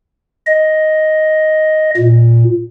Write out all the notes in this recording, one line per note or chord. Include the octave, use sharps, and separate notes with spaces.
D#5
A#2